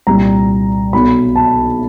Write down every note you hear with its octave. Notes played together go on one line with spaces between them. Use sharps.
C2 A#2 G3 A#5
B1 B2 F#3 B5
A5